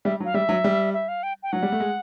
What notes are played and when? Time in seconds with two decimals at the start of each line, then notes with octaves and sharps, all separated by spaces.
0.05 G3 E5
0.20 F#3
0.25 F5
0.34 G3 E5
0.49 F#3
0.64 G3
0.93 E5
1.08 F5
1.23 G5
1.43 G5
1.52 F#3 F#5
1.63 G3
1.72 A3
1.80 G#3